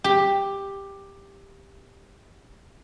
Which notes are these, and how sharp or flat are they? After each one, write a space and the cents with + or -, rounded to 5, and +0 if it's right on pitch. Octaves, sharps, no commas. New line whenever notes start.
G4 +10